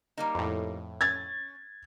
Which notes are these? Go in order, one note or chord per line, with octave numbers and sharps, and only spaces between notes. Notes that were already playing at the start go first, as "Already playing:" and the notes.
G3 A#3 D#4
F2 A2
C#4 G#6 A6